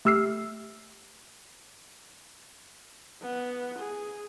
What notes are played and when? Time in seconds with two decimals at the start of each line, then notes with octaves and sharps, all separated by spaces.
0.05 A3 G4 E6 F6 C7
3.23 B3
3.78 G#4